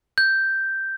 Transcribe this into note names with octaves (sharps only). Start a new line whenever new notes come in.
G6